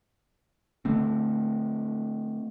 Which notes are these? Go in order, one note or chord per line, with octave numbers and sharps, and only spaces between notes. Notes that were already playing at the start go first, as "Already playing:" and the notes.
D3 A3 C4